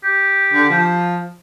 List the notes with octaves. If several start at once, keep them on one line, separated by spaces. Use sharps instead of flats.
G4
D3
F3